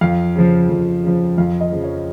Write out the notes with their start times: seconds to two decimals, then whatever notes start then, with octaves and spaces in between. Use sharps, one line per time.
0.01 F2 F5
0.36 C#3 F3
0.69 F2
1.04 C#3 F3
1.38 F2 F5
1.61 D#5
1.72 C#3 F3
1.84 C#5